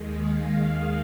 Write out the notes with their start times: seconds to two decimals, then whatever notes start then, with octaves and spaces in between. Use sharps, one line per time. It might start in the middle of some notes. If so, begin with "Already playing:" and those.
Already playing: D#2 D#3 G#3
0.20 F5